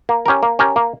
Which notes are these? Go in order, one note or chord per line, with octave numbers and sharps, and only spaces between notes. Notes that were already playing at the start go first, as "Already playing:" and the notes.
A#3
C#4 G4 A#4
A#3
C#4 G4 A#4
A#3